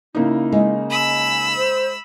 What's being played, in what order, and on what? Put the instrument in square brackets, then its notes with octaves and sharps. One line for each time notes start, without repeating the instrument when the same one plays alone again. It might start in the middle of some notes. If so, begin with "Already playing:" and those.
[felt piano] C#3 A#3 D#4 [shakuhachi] E4
[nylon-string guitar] G#3
[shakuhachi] G#5 [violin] B5 E6
[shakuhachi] C5